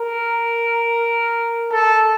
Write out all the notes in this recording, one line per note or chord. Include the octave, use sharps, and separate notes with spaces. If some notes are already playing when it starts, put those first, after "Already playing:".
Already playing: A#4
A4